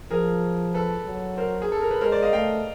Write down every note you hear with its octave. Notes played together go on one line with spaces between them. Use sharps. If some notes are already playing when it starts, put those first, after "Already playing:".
F3 G#4 A#4
A4 B4
F#3
A#4 C5
G#4
A4
A#4
B4
G#3 A#4 C5
C5 D5
D#5 F5
A3 F5 G5